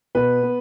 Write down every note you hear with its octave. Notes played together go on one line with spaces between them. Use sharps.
B2 B4
B3